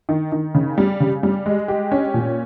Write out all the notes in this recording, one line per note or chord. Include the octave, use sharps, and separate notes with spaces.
D#3
D#3
C#3
G3
C#3
G3
G#3
G4
C#4
A#2